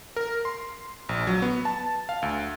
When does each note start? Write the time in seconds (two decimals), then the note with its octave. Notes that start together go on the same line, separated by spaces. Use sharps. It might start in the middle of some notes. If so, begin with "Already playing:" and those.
0.16 A#4
0.45 C6
1.09 A#1
1.27 F#3
1.42 B3
1.65 A5
2.09 F5
2.22 D2